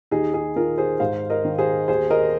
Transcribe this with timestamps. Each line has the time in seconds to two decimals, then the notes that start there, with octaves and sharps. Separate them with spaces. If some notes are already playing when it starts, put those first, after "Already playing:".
0.11 D#2 D#4 G#4
0.34 D#4 G#4
0.56 D#3 F4 A#4
0.78 G#4 C5
1.00 G#2 C5 F5
1.30 A#4 D#5
1.45 D#3
1.58 G#4 C5
1.88 D#2 G#4 C5
2.10 A#4 D#5